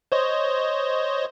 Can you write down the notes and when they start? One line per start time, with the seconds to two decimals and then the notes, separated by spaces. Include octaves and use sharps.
0.12 C5 C#5 D#5